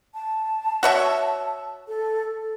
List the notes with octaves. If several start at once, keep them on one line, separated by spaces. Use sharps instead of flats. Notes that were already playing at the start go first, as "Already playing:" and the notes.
A5
F#4 C#5 E5
A4
A4